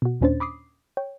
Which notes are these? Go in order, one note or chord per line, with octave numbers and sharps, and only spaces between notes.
B2 F#4
D#2 A#2 C#4 D4 C5 A6
B5 D6 D#6 C7
C#5 G5